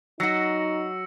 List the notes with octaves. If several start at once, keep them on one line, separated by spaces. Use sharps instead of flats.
F#3 D#4 F#4 E6 A#6 C#7